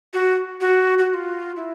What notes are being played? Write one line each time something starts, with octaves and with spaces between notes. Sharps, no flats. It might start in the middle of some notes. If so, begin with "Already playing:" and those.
F#4
F#4
F#4
F#4
F4
E4